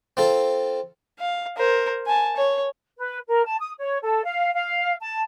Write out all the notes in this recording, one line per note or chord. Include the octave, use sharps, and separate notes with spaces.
C4 F4 A4
F5
A#4 C5
G#5 A5
C#5
B4
A#4
A5
D#6
C#5
A4
F5
F5
A5